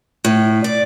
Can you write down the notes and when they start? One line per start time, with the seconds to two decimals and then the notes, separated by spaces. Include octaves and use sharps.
0.25 A2
0.64 D5